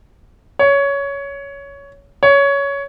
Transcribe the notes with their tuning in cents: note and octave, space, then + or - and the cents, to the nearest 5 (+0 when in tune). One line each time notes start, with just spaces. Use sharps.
C#5 +15
C#5 +15